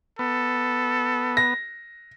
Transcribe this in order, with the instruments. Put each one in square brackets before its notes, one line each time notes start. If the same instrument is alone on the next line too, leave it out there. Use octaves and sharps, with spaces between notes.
[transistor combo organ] B3 [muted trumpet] A4
[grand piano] A#6